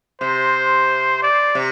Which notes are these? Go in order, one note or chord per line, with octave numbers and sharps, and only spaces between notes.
C3 C5
D5
C3